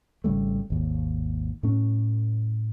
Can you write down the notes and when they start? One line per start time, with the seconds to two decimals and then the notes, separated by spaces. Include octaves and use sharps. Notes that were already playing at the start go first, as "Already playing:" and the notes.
0.24 G#1 C#3 G3 A3
0.70 G#1 D#2
1.63 A2 A3 C#4